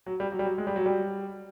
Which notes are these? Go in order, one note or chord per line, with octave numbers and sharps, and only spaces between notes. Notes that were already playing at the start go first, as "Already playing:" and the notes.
F#3
G3
F#3
G3
F#3
G#3
G3
F#3
G3